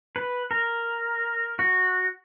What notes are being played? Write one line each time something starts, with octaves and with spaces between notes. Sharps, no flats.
B4
A#4
F#4